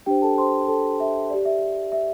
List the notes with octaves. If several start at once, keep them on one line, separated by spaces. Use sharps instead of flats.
D4 G4 C5 G5
A4 A5
C5 C6
A4 A5
E5
G4 D5
E5
E5